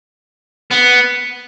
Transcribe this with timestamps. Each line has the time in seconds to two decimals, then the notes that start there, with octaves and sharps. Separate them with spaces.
0.71 B3